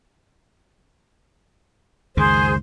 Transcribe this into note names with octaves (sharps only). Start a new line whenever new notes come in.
C#2 F#2 D#3 G#4 C5